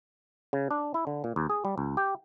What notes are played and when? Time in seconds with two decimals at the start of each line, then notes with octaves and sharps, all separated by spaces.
0.53 C#3
0.71 D4
0.94 E4
1.07 D3
1.24 A#2
1.36 D#2
1.50 G#4
1.65 G3
1.78 C#2
1.97 G4